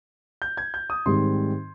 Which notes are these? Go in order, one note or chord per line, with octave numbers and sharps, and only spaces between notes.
G6
G#6
G6
D#6
G#2 D#3 G3 C4 C6